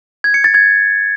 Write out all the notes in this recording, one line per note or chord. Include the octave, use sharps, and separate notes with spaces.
G#6
C#7
A6
G#6